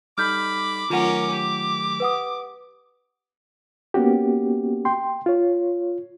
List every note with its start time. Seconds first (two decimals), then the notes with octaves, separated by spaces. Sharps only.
0.18 G3 D#4 A4 B5 D6 F6 G6
0.90 D#3 F#3 A3 C#4 F4 A#4 F#5
1.32 G4
2.00 B4 F#5 D#6
3.94 A#3 B3 C#4 F#4 G4
4.85 G5 C6
5.26 F4 C#5